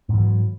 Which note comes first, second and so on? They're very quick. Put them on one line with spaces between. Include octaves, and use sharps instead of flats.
G#2 E3 F#3